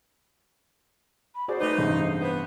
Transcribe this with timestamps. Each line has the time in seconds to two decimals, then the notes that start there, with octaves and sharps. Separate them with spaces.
1.35 B5
1.48 F#4 G#4 C5 D5
1.61 A3 D#4 B4 D5
1.78 A1 G2 C3 G#3
2.21 B3